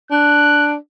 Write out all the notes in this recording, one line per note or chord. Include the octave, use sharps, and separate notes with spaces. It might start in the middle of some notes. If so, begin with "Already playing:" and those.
D4 F#6